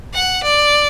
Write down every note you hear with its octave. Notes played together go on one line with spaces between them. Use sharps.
F#5
D5